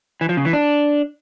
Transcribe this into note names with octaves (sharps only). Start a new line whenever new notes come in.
E3
F3
C#3
E3
D4